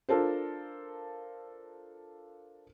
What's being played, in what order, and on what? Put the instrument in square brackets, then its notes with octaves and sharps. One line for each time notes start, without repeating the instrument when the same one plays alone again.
[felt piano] D4 F4 A4 A#4 C5